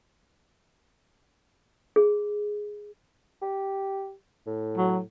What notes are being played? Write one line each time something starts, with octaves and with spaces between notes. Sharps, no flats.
G#4
G4
A2
F#3